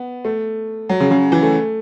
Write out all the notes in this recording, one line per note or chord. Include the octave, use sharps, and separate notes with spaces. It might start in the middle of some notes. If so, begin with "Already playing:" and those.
Already playing: B3
A3
F#3
C#3
C#3
E3
A3